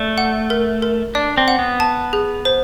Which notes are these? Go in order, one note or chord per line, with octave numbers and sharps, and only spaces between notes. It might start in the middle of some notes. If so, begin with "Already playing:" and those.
Already playing: A3 D5
F#5
A#4
A#4
D4 D5
C4
F#5
B3
A5
G#4
C5